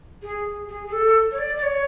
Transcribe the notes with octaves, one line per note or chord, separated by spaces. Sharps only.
G#4
G#4
G#4
A4
C#5
D5
D5
C#5